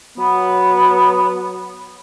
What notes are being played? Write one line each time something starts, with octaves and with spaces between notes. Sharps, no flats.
F#3 B3